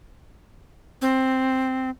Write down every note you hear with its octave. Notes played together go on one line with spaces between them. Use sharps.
C4